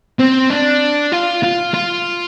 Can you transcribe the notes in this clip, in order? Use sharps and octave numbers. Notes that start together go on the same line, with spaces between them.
C4
D4
F4
F4
F4